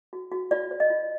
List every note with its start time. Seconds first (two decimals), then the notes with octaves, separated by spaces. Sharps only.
0.13 F#4
0.32 F#4
0.51 F4 D5
0.71 C5
0.80 D#5
0.90 F4